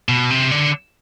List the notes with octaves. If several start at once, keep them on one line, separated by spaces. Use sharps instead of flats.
B2
C3
D3